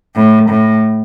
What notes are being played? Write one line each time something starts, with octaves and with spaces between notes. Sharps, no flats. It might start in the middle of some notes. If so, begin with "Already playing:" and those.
A2
A2